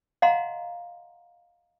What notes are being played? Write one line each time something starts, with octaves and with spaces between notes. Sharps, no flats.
D#5 F5 F#5 A#5 C6